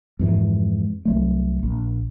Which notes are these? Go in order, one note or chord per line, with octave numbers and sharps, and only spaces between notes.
F2 G#2 E3
C2 F#3 A3
A#1